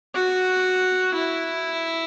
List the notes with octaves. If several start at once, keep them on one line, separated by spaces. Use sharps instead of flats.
F#4
E4